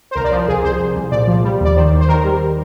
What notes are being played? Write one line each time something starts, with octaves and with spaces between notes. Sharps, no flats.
C5
C2 A#4
D5
F3 C5
C2 G#4
C2 C5
C2
C2
A#2 D5
F3
G3
D#2 D5
D#3 C5
D#2
C5
D#3 A#4
G3